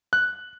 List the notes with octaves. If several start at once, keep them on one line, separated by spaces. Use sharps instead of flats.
F#6